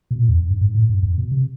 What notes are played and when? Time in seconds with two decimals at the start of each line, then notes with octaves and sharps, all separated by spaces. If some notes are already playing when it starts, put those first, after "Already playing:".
0.11 B2
0.19 A#2
0.29 E2
0.39 F2
0.50 G2
0.61 G#2
0.74 A2
0.89 G2
1.03 F2
1.18 B2
1.32 C3